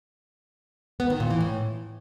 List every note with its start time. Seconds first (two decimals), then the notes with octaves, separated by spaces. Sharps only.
1.00 B3
1.10 D#3
1.20 A#2
1.30 E3
1.41 A2